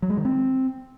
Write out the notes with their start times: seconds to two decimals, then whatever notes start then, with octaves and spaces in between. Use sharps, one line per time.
0.02 F#3
0.10 G#3
0.17 D#3
0.25 C4